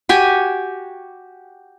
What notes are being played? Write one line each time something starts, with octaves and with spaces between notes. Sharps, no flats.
F#4 G4 G#5